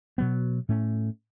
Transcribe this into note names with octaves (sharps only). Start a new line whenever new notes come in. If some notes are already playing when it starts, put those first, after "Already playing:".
B2 F#3 B3
A2 A3 C#4